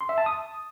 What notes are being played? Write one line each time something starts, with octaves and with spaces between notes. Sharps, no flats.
C6
E5
A5
D#6